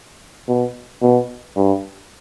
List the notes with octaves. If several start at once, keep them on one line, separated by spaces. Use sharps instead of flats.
B2
B2
G2